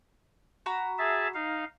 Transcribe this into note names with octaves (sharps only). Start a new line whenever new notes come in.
F#4 A#5 B5
G#4 E5 A5
D#4 F5